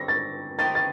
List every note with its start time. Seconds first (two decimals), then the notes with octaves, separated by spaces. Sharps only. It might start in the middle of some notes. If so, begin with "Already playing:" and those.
Already playing: G3 C4 A4 A#6
0.08 A6
0.59 D#3 A3 D#4 G4 C5 A6
0.75 A6